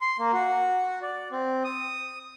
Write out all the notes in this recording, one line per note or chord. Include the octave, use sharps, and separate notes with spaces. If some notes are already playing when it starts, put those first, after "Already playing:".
C6
A#3
F#4
D5
C4
D#6